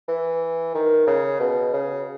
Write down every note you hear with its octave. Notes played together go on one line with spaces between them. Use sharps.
E3
D#3
C#3
B2
C#3